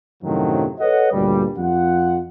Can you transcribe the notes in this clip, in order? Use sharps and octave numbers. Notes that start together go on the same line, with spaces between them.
F#2 A2 C3 D#3 F3 F#3
A4 B4 C#5 D#5 F#5
D2 G2 A#2 G3
F2 F4 F#5